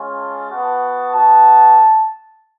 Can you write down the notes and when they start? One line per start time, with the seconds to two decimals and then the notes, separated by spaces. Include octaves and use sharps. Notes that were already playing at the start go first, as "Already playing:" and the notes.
Already playing: G#3 C#4 F4
0.18 A5
0.50 B3 F#4
1.15 B3 F#4 A5